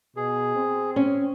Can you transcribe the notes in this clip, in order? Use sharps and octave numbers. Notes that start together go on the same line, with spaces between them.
B2 G#4
C4
C#4